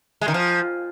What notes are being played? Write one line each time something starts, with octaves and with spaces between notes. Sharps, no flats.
G#3
D#3
F3